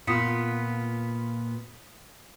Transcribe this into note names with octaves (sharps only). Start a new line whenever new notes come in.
A#2 B3 F4 D#6 B6 C#7